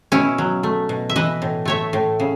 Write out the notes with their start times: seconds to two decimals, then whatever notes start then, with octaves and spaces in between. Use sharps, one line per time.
0.12 B2 C#4 E4
0.38 F#3
0.63 A3
0.89 B2
1.10 E5
1.16 E3 B4 D#5
1.42 A2
1.65 A3 C#5 E5
1.93 A2
2.20 C#3